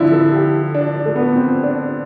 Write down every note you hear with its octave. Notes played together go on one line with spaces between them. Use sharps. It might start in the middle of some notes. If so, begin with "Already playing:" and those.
Already playing: D3 F3 C4 D4 E4 F4
A4
G4
D4
D4
A3
B3
C4
D4